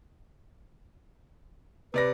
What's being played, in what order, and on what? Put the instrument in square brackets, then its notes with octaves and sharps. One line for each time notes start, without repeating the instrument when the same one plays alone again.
[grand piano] C3 D5 A#6 [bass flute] B4